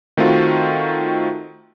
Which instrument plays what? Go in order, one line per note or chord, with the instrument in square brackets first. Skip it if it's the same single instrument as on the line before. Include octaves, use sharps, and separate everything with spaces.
[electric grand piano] D#3 A3 C4 F4 F#4